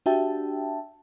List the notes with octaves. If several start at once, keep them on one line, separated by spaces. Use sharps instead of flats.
D4 F#4 G4 E5 G5 A5